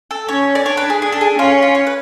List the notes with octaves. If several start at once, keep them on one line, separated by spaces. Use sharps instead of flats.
A4
C#4 C#5
D5
D4 C#5
B4
G#4
D4 G#4
A4
G#4
C#4 F4
F4
C#5
B4